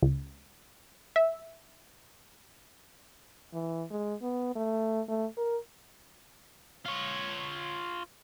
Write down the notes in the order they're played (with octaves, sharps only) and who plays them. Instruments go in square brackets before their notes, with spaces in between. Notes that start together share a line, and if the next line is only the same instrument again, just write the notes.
[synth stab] C#2
E5
[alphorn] E3
G#3
B3
A3
A3
A#4
[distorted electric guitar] F4 C#5